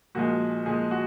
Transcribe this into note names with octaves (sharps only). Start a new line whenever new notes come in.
A#2 F3 G#3 F#4
A#2 F3 G#3 G#4
F#4